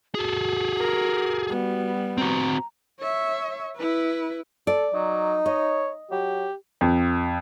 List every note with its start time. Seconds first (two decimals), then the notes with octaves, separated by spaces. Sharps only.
0.15 F#4 G#4 A4
0.79 A#4
1.50 G3 B3
2.18 C4 F#4 A#5
3.00 C#5 E5
3.77 E4 B4
4.67 A4 D5
4.94 F#3 D#4
5.46 C#5 D#5
6.11 F#3 G4
6.81 F2